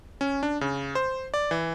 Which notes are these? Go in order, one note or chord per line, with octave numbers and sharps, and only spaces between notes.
C#4
D4
C#3
C5
D5
E3